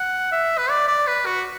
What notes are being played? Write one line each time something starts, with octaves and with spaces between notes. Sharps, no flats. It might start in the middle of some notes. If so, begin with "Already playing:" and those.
Already playing: F#5
E5
B4
D5
D5
B4
F#4